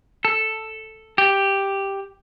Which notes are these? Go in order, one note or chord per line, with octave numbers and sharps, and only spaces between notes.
A4
G4